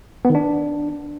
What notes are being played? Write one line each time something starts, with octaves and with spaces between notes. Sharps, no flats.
B3
D#3
D4